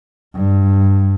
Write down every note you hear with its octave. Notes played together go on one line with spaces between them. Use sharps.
G2